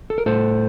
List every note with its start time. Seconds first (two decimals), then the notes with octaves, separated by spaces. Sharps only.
0.10 A4
0.18 A#4
0.26 A2 A4 C5